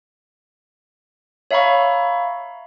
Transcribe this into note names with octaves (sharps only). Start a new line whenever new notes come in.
C#5 E5 F5 A#5 B5 C#6